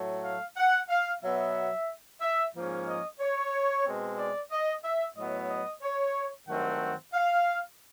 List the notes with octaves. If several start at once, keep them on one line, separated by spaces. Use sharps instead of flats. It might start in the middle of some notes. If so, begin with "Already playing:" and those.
Already playing: A2 F#3 A3
F5
F#5
F5
B2 F#3 B3 E5
E5
G#2 F3 A#3 C#4
D#5
C#5
B2 G#3 C4
D5
D#5
E5
A2 F#3 B3 D#5
D#5
C#5
G2 D#3 F#3 A3 C4 F#5
F5